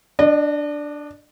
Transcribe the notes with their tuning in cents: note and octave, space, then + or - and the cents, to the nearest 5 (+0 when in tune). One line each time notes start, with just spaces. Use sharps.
D4 +0 D#5 -45